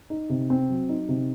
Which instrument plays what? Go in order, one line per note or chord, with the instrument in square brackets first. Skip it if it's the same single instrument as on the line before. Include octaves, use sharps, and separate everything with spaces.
[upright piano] D#4
C3
C4
F#3
D#4
C3